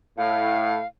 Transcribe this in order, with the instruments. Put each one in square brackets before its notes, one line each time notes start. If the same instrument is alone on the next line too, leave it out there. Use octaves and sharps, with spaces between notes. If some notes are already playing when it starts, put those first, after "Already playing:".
[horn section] A2 [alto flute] F5